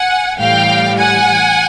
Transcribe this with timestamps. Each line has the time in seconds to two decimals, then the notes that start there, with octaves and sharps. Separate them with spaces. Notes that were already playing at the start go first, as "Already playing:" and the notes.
Already playing: F#5 G#5
0.39 A2 E3 G3 F5 G5
0.97 F#5 G#5